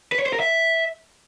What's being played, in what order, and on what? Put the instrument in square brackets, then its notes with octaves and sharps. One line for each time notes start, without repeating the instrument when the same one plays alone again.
[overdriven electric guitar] B4
C#5
C5
A#4
E5